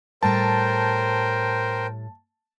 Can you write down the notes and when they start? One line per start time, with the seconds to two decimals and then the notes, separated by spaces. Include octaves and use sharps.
0.23 A2 G3 A#4 C5 G5 A5